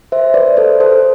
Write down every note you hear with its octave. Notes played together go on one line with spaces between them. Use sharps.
C5 E5
B4 D5
A4 C5
A4 C5